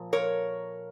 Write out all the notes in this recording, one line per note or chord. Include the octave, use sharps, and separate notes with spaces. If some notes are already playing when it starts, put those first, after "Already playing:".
Already playing: A#2 F3
A#4 C#5